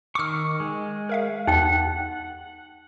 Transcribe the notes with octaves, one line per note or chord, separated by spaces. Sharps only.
D#3 C#6 D6 E6 F6
G#3
A#4 E5 F5
E2 D#4 F#5 G5